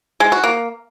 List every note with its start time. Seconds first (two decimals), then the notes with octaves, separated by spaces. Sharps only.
0.20 G#3
0.32 F#4
0.44 A#3